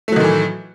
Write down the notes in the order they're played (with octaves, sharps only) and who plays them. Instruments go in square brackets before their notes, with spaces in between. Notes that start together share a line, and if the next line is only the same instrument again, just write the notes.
[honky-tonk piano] A3
F#3
D#3
A2
E3